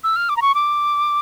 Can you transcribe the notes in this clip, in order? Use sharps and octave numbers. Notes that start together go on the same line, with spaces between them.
E6
F6
D6
A#5
C#6
D6